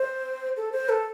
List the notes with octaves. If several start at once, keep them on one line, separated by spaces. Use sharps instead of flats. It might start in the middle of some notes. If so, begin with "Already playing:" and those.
Already playing: C5
A4
C5
A4